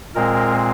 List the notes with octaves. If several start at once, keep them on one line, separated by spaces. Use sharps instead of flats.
A#2 G#3 C4 A#4